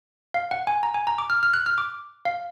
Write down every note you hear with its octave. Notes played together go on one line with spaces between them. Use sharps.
F5
F#5
G#5
A#5
G#5
A#5
D6
F6
F6
F#6
F6
D6
F5